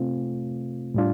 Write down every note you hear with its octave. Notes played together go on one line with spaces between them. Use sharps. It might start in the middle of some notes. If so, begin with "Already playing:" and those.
Already playing: C3 A3 C4 F4
A2 G3 D4 F4